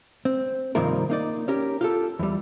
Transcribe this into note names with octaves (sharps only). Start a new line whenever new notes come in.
C4
G2 C3 D#3 F3 A#3 A#4
A#3 D#4 D5
C#4 G4 A#4
F4 G4 A4
E2 G3